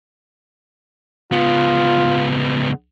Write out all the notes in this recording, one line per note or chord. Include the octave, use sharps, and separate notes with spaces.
C#2 B3 F4